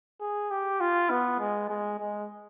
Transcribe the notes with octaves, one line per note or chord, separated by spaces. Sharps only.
G#4
G4
F4
B3
G#3
G#3
G#3